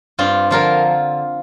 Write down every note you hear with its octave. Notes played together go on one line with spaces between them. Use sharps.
G2 C4 F4
D3 F3 F4 A#4